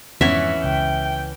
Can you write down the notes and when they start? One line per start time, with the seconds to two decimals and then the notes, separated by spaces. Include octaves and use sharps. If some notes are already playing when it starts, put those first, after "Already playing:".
0.21 F2 G#2 E3 B3 C#4 E5
0.64 C#2 G5